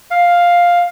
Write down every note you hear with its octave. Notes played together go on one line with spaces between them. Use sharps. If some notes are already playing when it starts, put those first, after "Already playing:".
F5